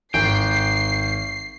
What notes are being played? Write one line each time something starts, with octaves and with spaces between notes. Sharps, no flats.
G#1 G5 C7